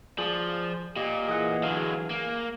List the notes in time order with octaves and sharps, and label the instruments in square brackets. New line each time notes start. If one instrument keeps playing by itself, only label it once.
[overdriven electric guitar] F3 [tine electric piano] F4 G#4 D5
[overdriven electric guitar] A#2 [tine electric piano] G4 D#5
[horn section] E3 G#4 [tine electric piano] D#5 F#5
[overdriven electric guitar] D3 F#3 [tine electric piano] F5
[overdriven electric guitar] A#3